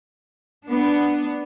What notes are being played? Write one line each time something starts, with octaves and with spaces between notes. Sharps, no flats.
B3 D4